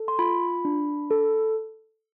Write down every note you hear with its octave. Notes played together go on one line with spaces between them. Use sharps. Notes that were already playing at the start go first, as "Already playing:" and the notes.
Already playing: A4
C6
F4 B5
D4
A4